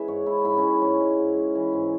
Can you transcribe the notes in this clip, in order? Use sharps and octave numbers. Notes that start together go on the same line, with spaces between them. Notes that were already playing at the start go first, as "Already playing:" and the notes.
Already playing: G#3 C#4 E4 G#4 B4 E5
G#2 C#5
G#3 E4
G#2 E4
C#4
G#3 E4
G#2 C#4
G#3
G#2
G#3
E3
G#2